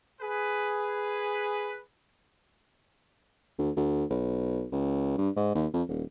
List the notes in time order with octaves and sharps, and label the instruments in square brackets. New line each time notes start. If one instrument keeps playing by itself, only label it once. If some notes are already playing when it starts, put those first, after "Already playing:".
[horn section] G#4 B4
[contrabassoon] D2
D2
B1
C#2
G2
G#2
D#2
F2
D#1